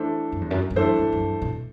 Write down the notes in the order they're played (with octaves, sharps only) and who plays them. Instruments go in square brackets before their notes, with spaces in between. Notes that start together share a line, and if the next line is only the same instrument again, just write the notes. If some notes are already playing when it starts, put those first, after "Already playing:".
Already playing: [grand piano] E3 A3 D4 A4 C5
[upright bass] F#2
E2
F#2
G2
[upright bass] F#2 [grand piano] E3 A3 D4 A4 C5
[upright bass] G2
F#2
G2
B2